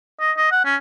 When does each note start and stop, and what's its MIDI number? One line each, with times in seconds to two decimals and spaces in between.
0.20 0.32 75
0.37 0.50 75
0.52 0.63 78
0.65 0.76 61